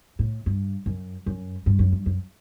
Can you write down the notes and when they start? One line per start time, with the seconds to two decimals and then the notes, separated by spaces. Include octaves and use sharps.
0.19 A2
0.46 G2
0.86 F#2
1.26 F#2
1.66 G2
1.79 F#2
1.92 G2
2.06 F#2